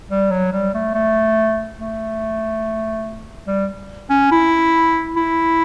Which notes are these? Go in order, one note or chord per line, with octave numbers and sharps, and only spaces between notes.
G3
F#3
G3
A3
A3
A3
G3
C#4
E4
E4